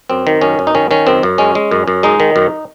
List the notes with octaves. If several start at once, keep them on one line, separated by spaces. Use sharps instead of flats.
F#2 C4
D#3
F#2 C#4
F#2
D#4
D#3 C#4
D#3 C#4
F#2 C4
F#2
G#3 C#4
G#3
F#2
F#2
G#3 D#4
D#3
F#2